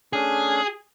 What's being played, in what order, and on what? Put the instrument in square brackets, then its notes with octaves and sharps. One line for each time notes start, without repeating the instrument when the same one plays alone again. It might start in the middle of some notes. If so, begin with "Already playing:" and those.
[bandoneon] A3 C#4 D4 [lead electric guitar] G#4